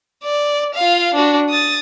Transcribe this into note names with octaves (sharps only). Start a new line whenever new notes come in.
D5
F4 F5
D4 F#4
D#6 A6